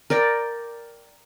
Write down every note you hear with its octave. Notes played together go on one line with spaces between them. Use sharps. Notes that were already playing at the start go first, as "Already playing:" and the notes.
A#4 D5 G5